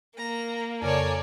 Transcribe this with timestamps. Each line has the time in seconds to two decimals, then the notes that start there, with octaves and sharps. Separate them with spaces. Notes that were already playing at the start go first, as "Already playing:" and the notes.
0.17 A#3 A#5
0.82 F2 C#3 A4 A#4 C#5 D5 G#5